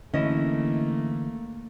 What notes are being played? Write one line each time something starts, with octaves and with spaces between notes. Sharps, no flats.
D3 E3 A3 A#3 C#4 E4 D#5